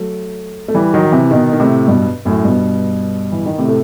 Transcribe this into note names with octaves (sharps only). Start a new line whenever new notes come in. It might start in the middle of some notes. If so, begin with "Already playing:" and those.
Already playing: F#3 A3
A3
E3 G3
D#3 F#3
F#3
C3 E3
B2 D#3
D#3
A2 C3
G2 B2
F#2 A2
G2 B2
E3
D#3
A2 C3
A3